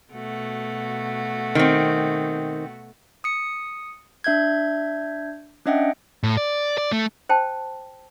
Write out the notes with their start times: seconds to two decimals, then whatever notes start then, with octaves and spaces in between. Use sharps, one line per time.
0.12 B2 A3 F#4
1.55 D#3 C4
3.24 D#6 C#7
4.24 D4 E5 G6 G#6
5.66 C#4 D4 D#5 E5 F#5 G5
6.23 A2
6.37 D5
6.78 D5
6.92 A3
7.29 C5 G5 A5